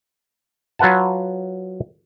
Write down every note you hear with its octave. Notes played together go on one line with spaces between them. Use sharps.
F#3 F4 B4 F#5 A5